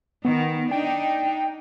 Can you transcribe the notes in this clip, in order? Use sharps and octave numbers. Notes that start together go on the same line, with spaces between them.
D#3 B3
D4 D#4 G5